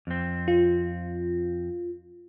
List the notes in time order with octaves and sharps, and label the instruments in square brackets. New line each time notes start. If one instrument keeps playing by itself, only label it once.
[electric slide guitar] F2 C4
[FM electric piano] F4